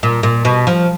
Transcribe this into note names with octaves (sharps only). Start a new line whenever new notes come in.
A#2
A#2
B2
F3